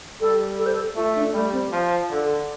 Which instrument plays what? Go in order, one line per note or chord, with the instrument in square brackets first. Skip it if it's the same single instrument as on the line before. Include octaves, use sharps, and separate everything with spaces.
[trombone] G3 [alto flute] A4
[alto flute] A4
C5
A4
[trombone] A3 [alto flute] F4
[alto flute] D4
[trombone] G3 [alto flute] A3
[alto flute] C4
[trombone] F3 [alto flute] C5
[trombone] D3 [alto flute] A4